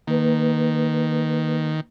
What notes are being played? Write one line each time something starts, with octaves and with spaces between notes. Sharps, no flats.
D#3 A#3 B4